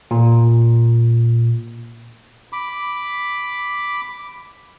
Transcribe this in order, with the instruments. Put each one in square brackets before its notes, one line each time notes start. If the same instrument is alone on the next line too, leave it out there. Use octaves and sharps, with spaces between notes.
[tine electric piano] A#2
[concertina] B5 D6